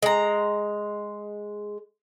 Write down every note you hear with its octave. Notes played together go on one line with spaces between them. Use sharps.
G#3 A#5